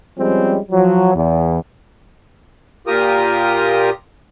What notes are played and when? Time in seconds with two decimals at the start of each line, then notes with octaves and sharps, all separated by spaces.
0.18 F3 G3 G#3 C4 C#4
0.72 F3 F#3
1.15 E2
2.87 A#2 F4 G4 A#4 D#6